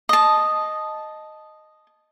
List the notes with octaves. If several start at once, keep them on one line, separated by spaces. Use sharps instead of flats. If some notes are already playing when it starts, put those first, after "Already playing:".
D#5 A5